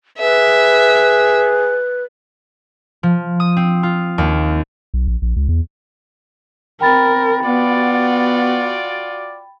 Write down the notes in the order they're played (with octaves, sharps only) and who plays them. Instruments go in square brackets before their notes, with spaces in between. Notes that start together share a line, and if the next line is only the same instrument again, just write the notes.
[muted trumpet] G#4 [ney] B4 [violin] E5
[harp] F3
D#6
C4
F4
D#2
[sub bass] B1
A#1
A#1
C#2
E2
[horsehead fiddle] C4 A#4 [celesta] G5 B5 A6
[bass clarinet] B3 [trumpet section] F4 D5 [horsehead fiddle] F#4